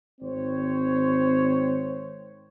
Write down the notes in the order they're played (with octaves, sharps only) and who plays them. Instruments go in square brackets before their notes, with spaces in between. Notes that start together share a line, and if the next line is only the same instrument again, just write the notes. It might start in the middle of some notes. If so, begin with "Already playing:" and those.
[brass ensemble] G#1 C4 C5 C#5